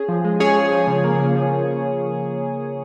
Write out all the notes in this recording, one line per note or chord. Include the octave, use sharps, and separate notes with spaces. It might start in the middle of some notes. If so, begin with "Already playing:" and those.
Already playing: C#4 G#4
F3
G#3
C#4 G#4 C#5
F3
F3
C#3
A#3
C#3
F3
C#3
F3